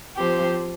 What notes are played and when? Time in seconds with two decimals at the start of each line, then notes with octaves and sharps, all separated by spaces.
0.18 F3 C4 G4 C5